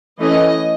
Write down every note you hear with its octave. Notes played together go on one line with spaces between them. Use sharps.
E3 A3 C#4 D#5